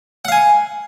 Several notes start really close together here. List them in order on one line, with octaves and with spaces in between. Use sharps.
F#5 F5 G#5